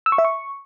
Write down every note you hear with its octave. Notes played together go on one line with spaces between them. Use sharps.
E6
C#6
E5
C#6